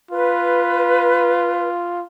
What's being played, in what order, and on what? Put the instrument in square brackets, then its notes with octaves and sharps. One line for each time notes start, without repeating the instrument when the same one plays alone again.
[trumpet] F4 [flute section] B4